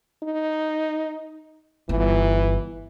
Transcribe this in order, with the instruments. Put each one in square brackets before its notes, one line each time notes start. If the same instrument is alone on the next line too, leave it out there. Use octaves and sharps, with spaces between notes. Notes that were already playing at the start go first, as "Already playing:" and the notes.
[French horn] D#4
[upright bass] G1 [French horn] E3